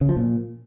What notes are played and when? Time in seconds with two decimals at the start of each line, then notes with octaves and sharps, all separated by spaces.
0.01 C#3
0.09 F3
0.16 A#2